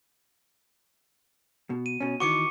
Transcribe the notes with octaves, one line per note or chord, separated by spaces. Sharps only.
B2
D#7
B2 C#4
D#3 E3 F#4 C#6 D6 C#7